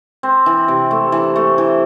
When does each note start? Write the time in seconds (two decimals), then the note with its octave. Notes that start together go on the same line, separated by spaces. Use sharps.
0.23 C4
0.46 E3
0.68 C3
0.91 A3
1.12 E3
1.36 A3
1.58 E3